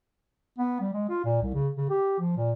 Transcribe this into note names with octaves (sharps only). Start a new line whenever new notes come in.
B3
G3
G#3
F4
A#2
C2
C#3
C#3
G4
F3
A#2